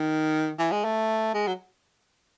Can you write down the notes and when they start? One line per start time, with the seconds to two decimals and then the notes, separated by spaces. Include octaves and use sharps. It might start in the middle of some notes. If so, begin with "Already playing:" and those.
Already playing: D#3
0.59 E3
0.72 G#3
0.84 A3
1.34 G#3
1.47 F#3